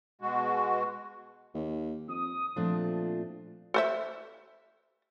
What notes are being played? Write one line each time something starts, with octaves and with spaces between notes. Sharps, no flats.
B2 G#3 F#4
D#2
F2 D#6
A#2 F3 A3 C4 D4 F4
A4 C5 E5